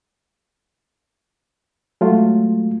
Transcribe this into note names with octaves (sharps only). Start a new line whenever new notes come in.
F#3 G#3 A3 F4